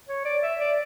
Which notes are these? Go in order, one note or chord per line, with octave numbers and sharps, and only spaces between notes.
C#5
D5
E5
D5